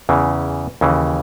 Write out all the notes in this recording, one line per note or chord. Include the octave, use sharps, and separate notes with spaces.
E2 C#3 E3
D#2 C#3 E3